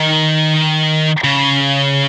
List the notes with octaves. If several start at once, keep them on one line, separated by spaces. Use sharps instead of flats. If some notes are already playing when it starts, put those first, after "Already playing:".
Already playing: D#3
C#3